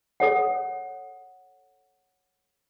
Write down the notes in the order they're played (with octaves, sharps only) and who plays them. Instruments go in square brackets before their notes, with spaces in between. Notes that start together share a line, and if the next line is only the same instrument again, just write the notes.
[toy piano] A4 C#5 F#5